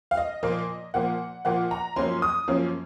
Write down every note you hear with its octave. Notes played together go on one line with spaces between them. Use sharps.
F5
D#5
A#2 F3 A#3
A#2 F3 A#3 F#5
A#2 F3 A#3 F#5
A#5
F#2 F3 A#3 C#4 C6
D#6
F#2 F3 A#3 C#4